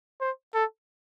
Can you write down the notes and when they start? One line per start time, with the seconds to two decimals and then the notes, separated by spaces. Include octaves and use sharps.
0.21 C5
0.54 A4